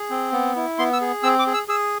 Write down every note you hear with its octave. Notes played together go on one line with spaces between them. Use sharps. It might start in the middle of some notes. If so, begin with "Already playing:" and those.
Already playing: G#4
C4
B3
E4
B3 C6
E6
G#4
C4 E6
D6
G#4
E6
G#4 E6